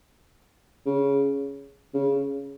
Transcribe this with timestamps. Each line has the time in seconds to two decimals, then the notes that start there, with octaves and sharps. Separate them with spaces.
0.86 C#3
1.94 C#3